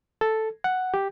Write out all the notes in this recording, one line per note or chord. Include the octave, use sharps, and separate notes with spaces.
A4
F#5
G4